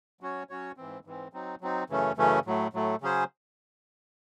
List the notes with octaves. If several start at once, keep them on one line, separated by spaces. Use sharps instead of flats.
F#3 C#4 F#4 C#5
F#3 C#4 F#4 C#5
G#2 E3 C4
G#2 E3 C4
F#3 C4 D#4
F#3 C4 D#4
F#2 C#3 E3 A3 C#4
F#2 C#3 E3 A3 C#4
A2 F#3 A3
A2 F#3 A3
C#3 F#3 C#4 G#4 C5